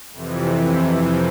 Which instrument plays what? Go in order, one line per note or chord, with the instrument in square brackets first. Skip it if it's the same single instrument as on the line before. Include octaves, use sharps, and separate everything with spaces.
[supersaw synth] F2 C3 E3